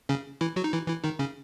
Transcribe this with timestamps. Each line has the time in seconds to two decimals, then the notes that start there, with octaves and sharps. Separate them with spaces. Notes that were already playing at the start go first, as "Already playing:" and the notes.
0.09 C#3 C#4
0.41 E3 E4
0.56 F#3 F#4
0.64 D#4
0.73 E3 E4
0.88 E3 E4
1.04 D#3 D#4
1.19 C#3 C#4